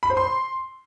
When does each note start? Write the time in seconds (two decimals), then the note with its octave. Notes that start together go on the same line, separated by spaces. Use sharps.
0.03 B5
0.10 C5
0.17 C6